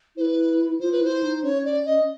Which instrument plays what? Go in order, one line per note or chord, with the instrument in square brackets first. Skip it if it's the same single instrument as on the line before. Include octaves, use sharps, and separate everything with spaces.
[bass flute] E4 [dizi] C5
[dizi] B4
[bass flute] F4 [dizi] C5
[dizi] B4
[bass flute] E4 [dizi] C5
[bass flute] D#4
[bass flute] C#4 [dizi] C#5
[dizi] D5
D#5